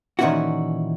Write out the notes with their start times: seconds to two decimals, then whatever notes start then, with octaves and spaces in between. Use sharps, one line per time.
0.19 A#2 D#3 E3 C#4 E4 F#4